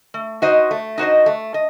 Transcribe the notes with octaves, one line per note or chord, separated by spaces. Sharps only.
A3
D#4 F#4 C5 D#5
A3
D#4 F#4 C5 D#5
A3
D#5